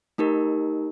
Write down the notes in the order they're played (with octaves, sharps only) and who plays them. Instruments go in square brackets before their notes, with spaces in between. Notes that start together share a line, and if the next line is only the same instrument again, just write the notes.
[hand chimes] A3 D#4 G4 A#4